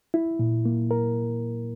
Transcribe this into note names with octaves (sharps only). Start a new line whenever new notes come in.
E4
A#2
A#3
A#4